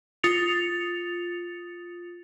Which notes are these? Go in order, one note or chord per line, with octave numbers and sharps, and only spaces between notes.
F4 D#6 A6 C#7 F7